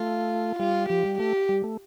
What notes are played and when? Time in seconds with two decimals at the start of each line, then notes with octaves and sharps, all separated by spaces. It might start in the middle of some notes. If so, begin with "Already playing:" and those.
Already playing: A3 F4
0.59 G3 F4
0.89 F3 G4
1.05 G3
1.19 A3 G4
1.49 G3
1.64 A3